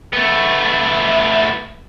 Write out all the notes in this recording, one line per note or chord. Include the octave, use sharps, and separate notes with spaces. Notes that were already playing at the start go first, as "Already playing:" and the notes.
A3 B3